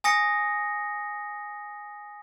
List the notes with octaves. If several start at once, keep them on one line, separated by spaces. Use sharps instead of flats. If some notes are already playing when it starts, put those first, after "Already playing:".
G#5 D#6 A#6 C#7